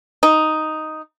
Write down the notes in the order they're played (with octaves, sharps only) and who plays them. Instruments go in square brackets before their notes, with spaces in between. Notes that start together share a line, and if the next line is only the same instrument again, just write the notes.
[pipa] D#4